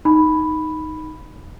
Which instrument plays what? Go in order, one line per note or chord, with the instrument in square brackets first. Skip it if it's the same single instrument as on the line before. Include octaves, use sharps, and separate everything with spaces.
[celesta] D#4 B5